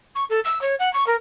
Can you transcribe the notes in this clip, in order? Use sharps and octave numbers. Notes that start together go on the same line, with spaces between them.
C#6
A4
E6
C#5
F#5
C#6
A#4